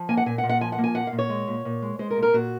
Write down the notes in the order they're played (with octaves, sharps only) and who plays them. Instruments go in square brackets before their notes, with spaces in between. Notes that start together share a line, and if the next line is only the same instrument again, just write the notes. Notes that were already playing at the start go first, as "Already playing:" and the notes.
Already playing: [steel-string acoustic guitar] F3
A#3 G#5
F#5
A#2 G#5
F#5
A#2
F#5
F3 G#5
F#5
A#3
G#5
A#2 F#5
F5
A#2
C#5
G#3
A#2
A#2
G#3
G#3 C5
A#4
A#2
A#4
A#2 F#4